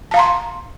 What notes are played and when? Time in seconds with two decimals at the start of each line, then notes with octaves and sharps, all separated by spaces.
0.11 A5
0.14 F5
0.16 A#5
0.19 C6